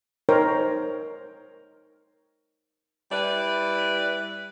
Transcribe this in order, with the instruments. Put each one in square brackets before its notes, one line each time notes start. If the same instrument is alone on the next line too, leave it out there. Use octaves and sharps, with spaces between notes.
[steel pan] D#4 A#4 C5 C#5 G5
[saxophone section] G3 E4 B4 D5